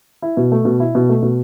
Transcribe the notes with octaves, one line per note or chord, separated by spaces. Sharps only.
E4
B2
A3
B2
E4
B2
A3
B2